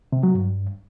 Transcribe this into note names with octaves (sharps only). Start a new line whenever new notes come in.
C3
F#3
G2